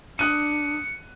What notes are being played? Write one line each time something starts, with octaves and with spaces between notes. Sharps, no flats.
D4 D#6 F#6 C#7 D#7